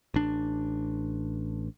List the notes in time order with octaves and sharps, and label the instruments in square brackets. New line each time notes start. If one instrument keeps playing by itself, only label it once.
[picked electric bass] A1 D4